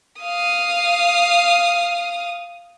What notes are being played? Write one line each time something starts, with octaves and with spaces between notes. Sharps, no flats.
F5 D#6